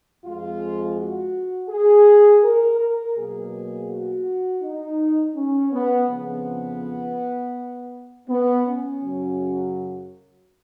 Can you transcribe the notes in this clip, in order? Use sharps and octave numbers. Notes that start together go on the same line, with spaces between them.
F2 F3 G#3 F4
F#4
G#4
A#4
A#4
B2 F#3 A#3 G#4
F#4
D#4
C#4
B3
F2 C#3 F3 B3
B3
C#4
F#2 C#3 F#3